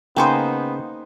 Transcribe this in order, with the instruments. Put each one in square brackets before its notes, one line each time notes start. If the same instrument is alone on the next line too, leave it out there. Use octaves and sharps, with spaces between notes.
[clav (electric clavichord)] C#3 [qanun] A#3 D#4 C5 [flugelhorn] B3 [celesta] G5